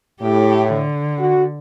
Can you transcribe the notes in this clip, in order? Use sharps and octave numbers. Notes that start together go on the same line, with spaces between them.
A2 G4
D3
F#4